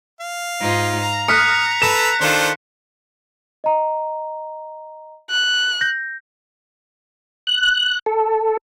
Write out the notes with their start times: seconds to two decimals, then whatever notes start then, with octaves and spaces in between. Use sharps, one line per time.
0.20 F5
0.60 G#2 D#4 F4
1.00 A#5
1.28 D#6 F6 F#6 B6 C#7
1.82 A4 B4 E7
2.21 D#3 D4 F4 A4 C5
3.64 D#5 A#5
5.30 F#6
5.81 G6 A#6
7.47 F#6
8.06 A4